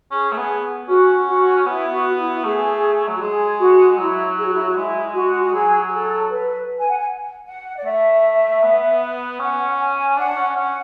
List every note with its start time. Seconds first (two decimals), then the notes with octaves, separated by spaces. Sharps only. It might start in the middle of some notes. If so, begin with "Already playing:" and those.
0.11 C#4 G#4
0.32 A3
0.37 B3
0.88 C#4 F#4
1.27 F#4
1.66 B3 E4
1.92 F#4
2.18 E4
2.43 A3 G#4
3.08 F#3
3.17 F#4
3.21 G#3 G#4
3.59 F#4
3.98 F#3 E4
4.37 G#4
4.46 F#4
4.54 E4
4.63 F#4
4.76 G#3 E4
5.14 F#4
5.43 F#4
5.52 F#3 G#4
5.87 G#4
5.92 A4
6.30 B4
6.78 G#5
6.89 F#5
6.98 G#5
7.46 F#5
7.77 D5
7.85 A3 E5
8.63 B3
9.39 C#4 F#5
9.79 G#5
10.17 D4 F#5
10.29 D4
10.37 C#4
10.55 C#4 F#5